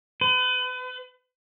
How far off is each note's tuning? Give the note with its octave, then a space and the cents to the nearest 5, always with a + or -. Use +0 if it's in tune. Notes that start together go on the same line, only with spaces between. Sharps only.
B4 +35